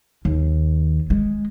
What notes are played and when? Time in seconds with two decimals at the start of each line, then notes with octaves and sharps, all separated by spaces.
0.25 D#2
1.10 G#3